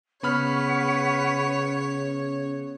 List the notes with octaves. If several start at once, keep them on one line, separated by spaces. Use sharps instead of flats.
C#3 B3 B4 C#5 F#5 B5 C#6 F6